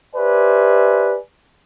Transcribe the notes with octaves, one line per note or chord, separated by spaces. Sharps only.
G4 B4 C5 D5 E5 G#5